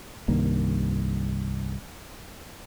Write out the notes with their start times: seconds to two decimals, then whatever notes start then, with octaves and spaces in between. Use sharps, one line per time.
0.28 C2 G2 D#3 A#3